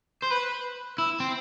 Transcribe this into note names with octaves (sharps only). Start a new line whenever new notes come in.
C5
B4
E4
C4